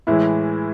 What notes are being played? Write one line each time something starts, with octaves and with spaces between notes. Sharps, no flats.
A2 E3 G#3 E4